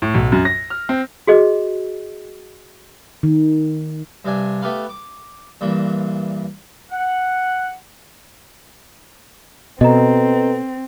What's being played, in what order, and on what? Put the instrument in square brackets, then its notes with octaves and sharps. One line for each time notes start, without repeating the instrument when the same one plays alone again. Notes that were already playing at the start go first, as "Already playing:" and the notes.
[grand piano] A2
B1
F#2
A#6
F6
C4
[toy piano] F#4 G#4 D#5
[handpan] D#3
[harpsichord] G2 C3 D4 G#5
A3 B3 G4 B4 F5
D6
G2 A#2 E3
[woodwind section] F#5
[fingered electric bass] B2 [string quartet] C4 [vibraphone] A4 B4 [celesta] D#5 A#5